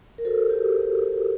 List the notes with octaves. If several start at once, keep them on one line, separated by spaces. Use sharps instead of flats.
A#4
F#4 A4 C5
F#4 G4